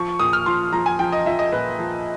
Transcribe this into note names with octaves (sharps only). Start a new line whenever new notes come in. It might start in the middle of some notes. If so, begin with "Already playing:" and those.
Already playing: F3 C#6
A#2 D#6
F6
F3 C6
F3 A#5
G#5
F3 G5
D#5
F3 E5
D#5
A#2 B4
F3